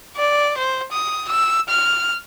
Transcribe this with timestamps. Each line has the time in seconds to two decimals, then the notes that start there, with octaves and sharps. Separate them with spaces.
0.16 D5
0.58 C5
0.92 D#6
1.29 E6
1.69 F6